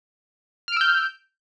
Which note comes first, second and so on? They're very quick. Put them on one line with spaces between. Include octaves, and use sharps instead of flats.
F6 D7 E6 G6